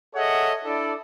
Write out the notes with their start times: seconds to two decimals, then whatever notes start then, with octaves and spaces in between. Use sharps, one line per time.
0.16 G#4 A4 C#5 D#5 E5 F#5
0.65 D4 E4 A4 D5